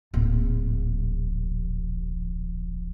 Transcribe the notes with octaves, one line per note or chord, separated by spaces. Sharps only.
D1 A#1